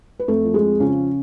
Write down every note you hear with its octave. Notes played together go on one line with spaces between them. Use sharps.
B4
F2 A3 A4
F3
G#3 G#4
F2
C#3 F3 C#4